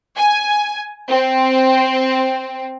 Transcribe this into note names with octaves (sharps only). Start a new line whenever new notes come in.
G#5
C4